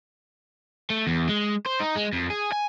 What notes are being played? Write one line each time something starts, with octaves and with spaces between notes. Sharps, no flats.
A3
E2
G#3
C5
D#4
G#3
F2
G#4
G#5